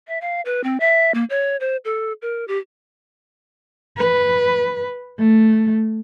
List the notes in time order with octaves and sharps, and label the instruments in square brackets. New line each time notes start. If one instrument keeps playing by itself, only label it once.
[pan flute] E5
F5
B4
C4
E5
A#3
C#5
C5
A4
A#4
G4
[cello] B4
A3